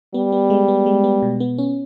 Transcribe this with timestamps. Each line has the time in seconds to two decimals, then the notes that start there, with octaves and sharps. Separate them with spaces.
0.14 G3 B3
0.32 B3
0.50 G#3
0.68 B3
0.86 G#3
1.04 B3
1.22 B2
1.40 B3
1.58 C#4